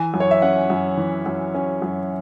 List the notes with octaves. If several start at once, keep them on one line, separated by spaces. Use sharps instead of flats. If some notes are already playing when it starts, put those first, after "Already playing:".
Already playing: E3 G#5
F#2
C#5
E5
C#4 F#5
F#2
E3
F#2
C#4
F#2